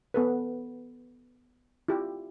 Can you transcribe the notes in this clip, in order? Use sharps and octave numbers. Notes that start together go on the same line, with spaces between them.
B3 A4 B4
E4 F4 G4